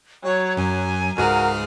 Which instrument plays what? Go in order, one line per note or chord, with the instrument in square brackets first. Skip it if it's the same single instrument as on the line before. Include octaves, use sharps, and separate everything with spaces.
[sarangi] F#3 [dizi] C#5
[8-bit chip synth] F#2 [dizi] G#5
[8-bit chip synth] C#2 G#2 G#4 [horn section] F#4 A#4 [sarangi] F5